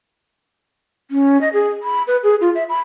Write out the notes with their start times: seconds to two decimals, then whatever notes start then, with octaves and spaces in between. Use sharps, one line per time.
1.11 C#4
1.41 D#5
1.53 G#4
1.82 B5
2.07 B4
2.23 G#4
2.41 F4
2.55 E5
2.69 B5